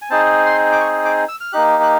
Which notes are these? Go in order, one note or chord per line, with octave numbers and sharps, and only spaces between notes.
G#5
C4 D#4 G#4 A5
C6
D6
C#6
D6
E6
F6
A#3 D#4 G4 F#6
F#6